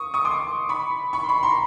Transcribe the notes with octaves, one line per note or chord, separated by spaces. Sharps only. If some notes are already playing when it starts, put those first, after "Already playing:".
Already playing: C#6 D#6
C#6 D#6
C6 D6
B5 C#6
B5 C#6
C6
B5 C#6
A#5 C6